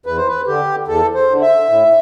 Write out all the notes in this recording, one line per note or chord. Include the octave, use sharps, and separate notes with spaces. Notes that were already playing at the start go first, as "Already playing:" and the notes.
E2 B4
C5
B4
D3 G4
E2 A4
C5
D3
E5
A2